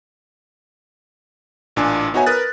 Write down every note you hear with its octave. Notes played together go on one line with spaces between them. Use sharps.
A1 A#2 D4 G#5
B3 D#4 F#4 C#5 E5 G#5
A#4 B4 D#6 F#6 A6